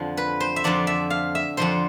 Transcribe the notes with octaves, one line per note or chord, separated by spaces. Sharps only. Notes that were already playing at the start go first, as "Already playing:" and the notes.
Already playing: F2 D3 F3
B4
C5
E5
F2 D3 F3 D5
E5
F5
E5
F2 D3 F3 C5